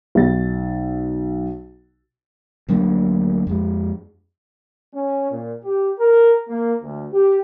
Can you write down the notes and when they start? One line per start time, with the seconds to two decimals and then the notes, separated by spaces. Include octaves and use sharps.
0.15 B1 A6
2.69 D2 F#3 A#3 D4
3.47 F2 G#3
4.93 C#4
5.30 A#2
5.63 G4
5.98 A#4
6.48 A#3
6.81 D2
7.11 G4